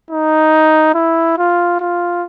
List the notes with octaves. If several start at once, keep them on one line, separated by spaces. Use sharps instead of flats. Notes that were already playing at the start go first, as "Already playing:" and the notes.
D#4
E4
F4
F4